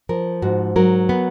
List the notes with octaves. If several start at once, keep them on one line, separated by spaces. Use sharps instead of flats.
F3 A#4
G#2 F#4
F#3 A#4
B3